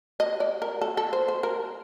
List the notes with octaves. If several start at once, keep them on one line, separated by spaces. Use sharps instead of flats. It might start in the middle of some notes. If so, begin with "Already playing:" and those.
D#5
D5
A#4
A4
A4
C5
C5
A#4